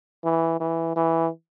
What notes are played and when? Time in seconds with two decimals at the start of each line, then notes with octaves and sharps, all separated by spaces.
0.24 E3
0.60 E3
0.96 E3